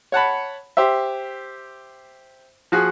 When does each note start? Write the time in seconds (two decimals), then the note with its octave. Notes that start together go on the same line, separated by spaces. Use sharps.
0.12 C#5 F#5 A5 B5
0.77 G4 C5 E5
2.72 F3 F#4 G#4